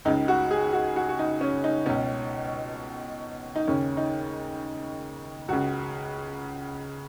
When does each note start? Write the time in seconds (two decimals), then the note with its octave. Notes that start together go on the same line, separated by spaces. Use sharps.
0.05 C#2 C#3 D#4
0.28 F#4
0.51 G#4
0.73 F#4
0.96 F#4
1.09 F#4
1.19 D#4
1.41 C#4
1.64 D#4
1.86 C#2 B2 C#4
3.56 D#4
3.67 D#2 C#3 C#4
3.97 D#4
5.48 C#2 C#3 F#4